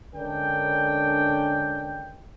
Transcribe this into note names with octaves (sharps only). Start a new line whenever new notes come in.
D3 G#3 C#4 D4 A#4 G5